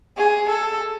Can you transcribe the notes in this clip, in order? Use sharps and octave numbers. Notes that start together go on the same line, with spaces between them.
G#4
A4